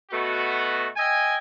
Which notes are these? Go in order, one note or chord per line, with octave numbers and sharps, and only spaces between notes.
B2 A3 B3 F#4
D#5 E5 G5 G#5